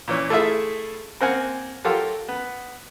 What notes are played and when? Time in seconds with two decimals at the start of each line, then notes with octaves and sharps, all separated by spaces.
0.08 A#2 E3 C#4
0.30 A3 E4 F4 G#4 E5
1.21 A#3 C4 F#5 G#5 F6
1.85 F#3 F4 G4 A4 A#4
2.29 B3